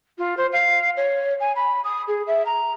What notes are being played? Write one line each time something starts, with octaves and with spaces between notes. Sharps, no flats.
F4
C5
F5
C#5
G#5
B5
D#6
G#4
E5
A#5